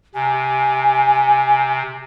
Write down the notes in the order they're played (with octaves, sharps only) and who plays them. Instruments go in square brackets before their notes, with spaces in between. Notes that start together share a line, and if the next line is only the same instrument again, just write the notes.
[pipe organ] C3 [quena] G#5